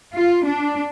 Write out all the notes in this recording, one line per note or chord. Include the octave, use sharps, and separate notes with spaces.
F4
D4